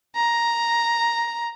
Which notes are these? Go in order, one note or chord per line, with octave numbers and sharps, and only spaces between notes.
A#5